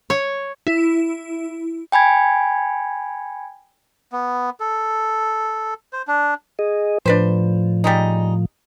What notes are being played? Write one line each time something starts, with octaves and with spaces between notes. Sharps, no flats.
C#5
E4
G5 G#5 B5 G#6
B3
A4
C5
D4
G#4 D#5
A2 F3 D4 B4 C5
G3 G#3 D#4